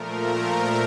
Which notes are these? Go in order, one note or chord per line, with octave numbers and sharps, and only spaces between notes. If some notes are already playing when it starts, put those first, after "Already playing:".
Already playing: A#2 F3 A3 A#4
A#4